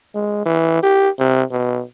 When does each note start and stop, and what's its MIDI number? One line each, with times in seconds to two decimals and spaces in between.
0.15 0.42 56
0.46 0.78 52
0.83 1.10 67
1.19 1.43 48
1.51 1.82 47